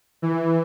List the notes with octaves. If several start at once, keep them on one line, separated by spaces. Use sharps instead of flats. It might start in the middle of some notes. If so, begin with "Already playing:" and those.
E3